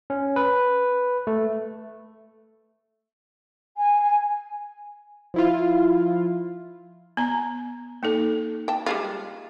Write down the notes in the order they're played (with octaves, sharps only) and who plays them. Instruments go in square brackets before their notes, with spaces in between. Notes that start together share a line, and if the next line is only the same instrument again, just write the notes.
[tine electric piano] C#4
B4
A3
[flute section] G#5
[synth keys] F3 E4 F4
[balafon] B3 A#5
A#3 D#4 A4
[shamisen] G5 A5
G3 G#3 F4